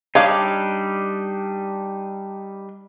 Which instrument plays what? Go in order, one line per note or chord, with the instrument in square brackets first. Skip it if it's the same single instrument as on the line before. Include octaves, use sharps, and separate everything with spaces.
[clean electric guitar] G3 D4 D#4 [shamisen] C#5 F5